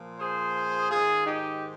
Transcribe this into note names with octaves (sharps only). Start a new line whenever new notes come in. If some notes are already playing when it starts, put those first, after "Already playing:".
Already playing: A#2 F3
G#4 C5
G#2 D#3 F4 G#4
D#4 G4